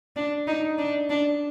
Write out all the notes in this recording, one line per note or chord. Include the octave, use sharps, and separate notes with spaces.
D4
D#4
D4
D4